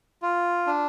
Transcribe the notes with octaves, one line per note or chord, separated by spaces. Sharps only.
F4
D4